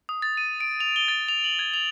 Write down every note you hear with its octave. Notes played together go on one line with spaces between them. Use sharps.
D#6
A6
D#7
D7
F7
G7
A6
F7
F#7
G#6
F7